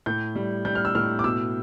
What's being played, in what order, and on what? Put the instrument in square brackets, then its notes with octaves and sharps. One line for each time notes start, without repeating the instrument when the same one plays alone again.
[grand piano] A2 G6
G3
G3 G6
F6
E6
A2 F6
D6
B2 E6